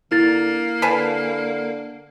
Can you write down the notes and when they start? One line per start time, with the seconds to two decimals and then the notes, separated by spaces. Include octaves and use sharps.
0.12 D3 A#3 E4 A6
0.82 D3 B4 G#5 A5